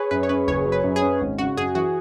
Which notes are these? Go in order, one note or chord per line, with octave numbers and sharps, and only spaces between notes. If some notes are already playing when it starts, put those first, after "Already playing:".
Already playing: G#4 B4 C#5
F#2 B4
C#5
C#4 B4
F#1 C#5
F#3
B4
F#2
G#4
C#4
G#1
C#3 F#4
F#2 G#4
E3 F#4